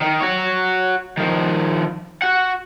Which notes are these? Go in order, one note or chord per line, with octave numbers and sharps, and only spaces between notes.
D#3
F#4 C#5
D#3 F3
F#4 F#5